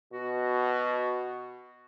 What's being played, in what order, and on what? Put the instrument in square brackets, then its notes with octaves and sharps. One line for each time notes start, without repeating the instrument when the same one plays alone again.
[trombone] B2 [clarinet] F#4